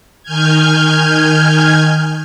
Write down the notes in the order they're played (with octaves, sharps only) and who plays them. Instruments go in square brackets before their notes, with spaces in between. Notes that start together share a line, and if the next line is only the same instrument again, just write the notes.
[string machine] D#3 G#5 F6 G6 G#6